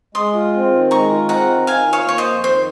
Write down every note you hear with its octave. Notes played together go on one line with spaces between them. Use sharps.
G#3 C6 D#6
F4
C4
D#3
G#3 A#5 C#6
F4
C4 F#5 A#5
D#3
D#3 F5 G#5
F4
C#5 F5
A#3 C#5
C5 D#5
F2
D#3 C5